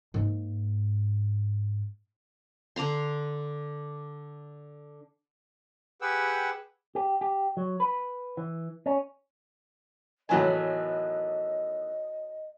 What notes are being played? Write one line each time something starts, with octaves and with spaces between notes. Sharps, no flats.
G#2 A#3
D3 D4 A#5 C6
G4 G#4 B4 F#5 G5 E6
G4
G4
F#3
B4
E3
C#4
A2 D#3 E3 F#3 B3 D#5 G#5